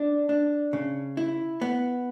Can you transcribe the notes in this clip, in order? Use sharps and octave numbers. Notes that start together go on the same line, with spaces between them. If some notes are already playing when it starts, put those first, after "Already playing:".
Already playing: D4
D4
C#3
E4
B3